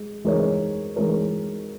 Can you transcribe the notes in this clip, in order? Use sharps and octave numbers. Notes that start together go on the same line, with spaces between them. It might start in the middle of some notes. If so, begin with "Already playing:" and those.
Already playing: G#3
E3 G#3 D#4 A#4 C#5
E3 G#3 D#4 A#4 C#5